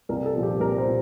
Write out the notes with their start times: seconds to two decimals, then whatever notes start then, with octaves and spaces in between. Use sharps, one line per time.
0.09 C2 A#4
0.26 A4
0.35 A#2 F3
0.43 G4
0.60 C2 A#4
0.78 C5
0.87 A#2